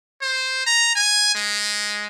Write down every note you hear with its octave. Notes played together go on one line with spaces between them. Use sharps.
C5
A#5
G#5
G#3